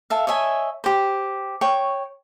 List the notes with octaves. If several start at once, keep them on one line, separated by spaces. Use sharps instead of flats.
A4 E5 F5
C#5 D#5 E5 G#5
G4 C5
C#5 G5 C#6